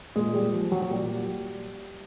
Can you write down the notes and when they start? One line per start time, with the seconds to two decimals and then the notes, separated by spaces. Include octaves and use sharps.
0.16 A#2 G#3
0.35 G3
0.53 F3
0.72 F#3
0.82 F#3
0.91 A#2 G3